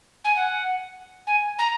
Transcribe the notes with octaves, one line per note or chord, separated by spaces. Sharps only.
G#5
F#5
G#5
A#5